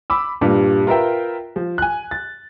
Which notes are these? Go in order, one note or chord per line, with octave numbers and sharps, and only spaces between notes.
B5 D6 E6
G2 A#2 G3
F4 A#4 B4 E5 G5
F3
G#5 F#6
A6